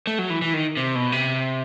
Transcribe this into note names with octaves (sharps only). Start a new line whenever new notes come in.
A3
F#3
E3
E3
D#3
C3
B2
C3